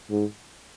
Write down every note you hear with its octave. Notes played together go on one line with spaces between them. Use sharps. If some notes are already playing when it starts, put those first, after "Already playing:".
G#2